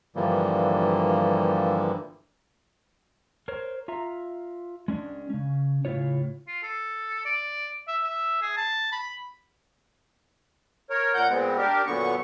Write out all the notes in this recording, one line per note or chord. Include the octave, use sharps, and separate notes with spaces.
G2 D3 E3 F3 G3 A#3
A#4 C5 C#5
F4 E5 A#5
G#3 C#4 D4
C#3 C#4
A2 C#3 E4 F4 C#5
F4
A4
D5
E5
E5
G#4
A5
B5
A#4 C#5
A#2 A#4 F#5 G6
A#2 G#3 B3 C4
D4 G4 A#4
F#2 A#2 D3 B3 C#6